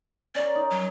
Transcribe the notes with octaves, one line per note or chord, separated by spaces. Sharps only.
C#4 A#4 D5
D#4
F#3